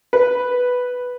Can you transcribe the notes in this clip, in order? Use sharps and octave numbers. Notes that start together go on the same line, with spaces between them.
B4